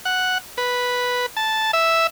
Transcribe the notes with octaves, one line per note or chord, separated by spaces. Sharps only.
F#5
B4
A5
E5